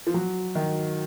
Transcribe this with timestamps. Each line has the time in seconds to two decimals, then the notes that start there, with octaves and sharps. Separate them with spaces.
0.07 F3
0.14 F#3
0.55 D#3